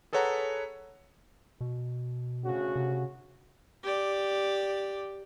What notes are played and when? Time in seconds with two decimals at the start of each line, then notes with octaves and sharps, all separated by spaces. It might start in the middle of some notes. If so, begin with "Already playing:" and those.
0.13 G#4 A4 B4 C#5 F#5 A#5
1.61 B2
2.43 D2 C#3 F#4
2.76 C3
3.84 G4 D5